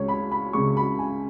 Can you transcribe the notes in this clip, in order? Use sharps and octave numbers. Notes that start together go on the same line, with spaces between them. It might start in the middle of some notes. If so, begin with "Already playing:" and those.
Already playing: C#2 C#3 G#3 C#5
B5
B5
C#2 C#3 G#3 C#6
B5
G#5